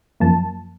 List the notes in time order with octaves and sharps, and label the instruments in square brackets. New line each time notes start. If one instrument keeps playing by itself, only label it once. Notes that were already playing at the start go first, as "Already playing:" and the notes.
[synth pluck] F#2 F3 A#3 A5